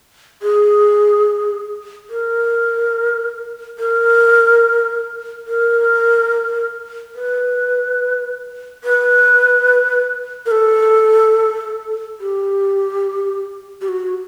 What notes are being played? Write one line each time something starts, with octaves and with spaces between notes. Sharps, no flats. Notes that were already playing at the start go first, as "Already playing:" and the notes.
G#4
A#4
A#4
A#4
B4
B4
A#4
A4
G4
G4
F#4